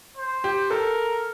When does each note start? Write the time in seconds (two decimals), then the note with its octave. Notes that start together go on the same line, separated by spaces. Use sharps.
0.17 C5
0.44 G4
0.70 A4 A#4